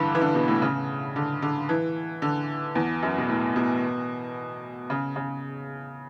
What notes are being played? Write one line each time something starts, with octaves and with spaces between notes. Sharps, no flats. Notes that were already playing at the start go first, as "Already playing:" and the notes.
Already playing: G2 D3 E3
E3
D3
B2
A2
C#3
D3
D3
E3
D3
E2
F#2
B2
A2
B2
C#3
C#3